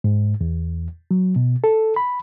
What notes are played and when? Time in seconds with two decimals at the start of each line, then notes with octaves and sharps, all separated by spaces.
0.04 G#2
0.41 E2
1.11 F#3
1.36 B2
1.64 A4
1.96 B5